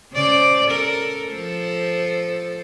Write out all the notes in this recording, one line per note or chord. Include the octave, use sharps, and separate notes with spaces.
C#3 C5 D5
A4 A#4
F3 A4 C5